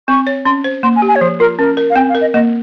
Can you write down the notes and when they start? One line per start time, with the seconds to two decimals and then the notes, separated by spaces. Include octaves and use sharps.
0.08 C4 C#6
0.27 C#5
0.45 C#4 C6
0.64 C5
0.83 A#3 C6
0.96 G#5
1.02 G4
1.08 G#5
1.16 C#5
1.21 F3 C5
1.40 F4 A#4
1.59 C#4 A#4
1.77 A#4
1.90 F5
1.96 C4 G5
2.09 F5
2.15 A#4
2.21 D#5
2.34 A#3 D#5